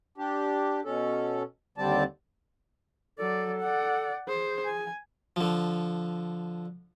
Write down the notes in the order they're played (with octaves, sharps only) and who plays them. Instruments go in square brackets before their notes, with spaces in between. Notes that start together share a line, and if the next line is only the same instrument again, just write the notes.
[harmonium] D4 G4
B2 C#4 A4
D#2 D3 G3 C4 D5 A5
[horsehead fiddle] F#3 D5 [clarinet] A4
[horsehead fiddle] D5 F#5
[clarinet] G#4 [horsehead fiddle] C5
[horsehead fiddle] G#5
[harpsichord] D3 F3